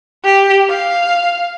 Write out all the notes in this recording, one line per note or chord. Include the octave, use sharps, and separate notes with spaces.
G4
F5